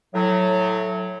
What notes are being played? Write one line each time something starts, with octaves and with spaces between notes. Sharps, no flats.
A2 F#3